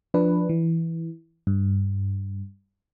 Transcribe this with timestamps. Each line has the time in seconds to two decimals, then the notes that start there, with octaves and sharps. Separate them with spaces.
0.14 F3 D4 B4
0.49 E3
1.47 G2